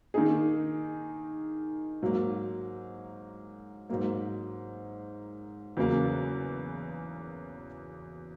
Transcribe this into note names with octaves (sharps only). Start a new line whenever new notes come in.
D#3 A#3 D#4 G#4
G#2 F#3 A#3
G#2 F#3 A#3
E2 C#3 F#3 A#3